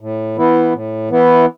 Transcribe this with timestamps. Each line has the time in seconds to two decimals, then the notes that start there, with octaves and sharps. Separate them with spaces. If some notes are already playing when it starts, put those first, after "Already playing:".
0.01 A2
0.37 E3 B3 E4
0.73 A2
1.10 E3 B3 E4